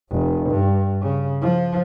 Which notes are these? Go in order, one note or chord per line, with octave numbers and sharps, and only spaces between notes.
F1
G2
C#3
F3